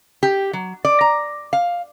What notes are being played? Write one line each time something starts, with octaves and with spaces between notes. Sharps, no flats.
G4
F#3
D5
A#5
F5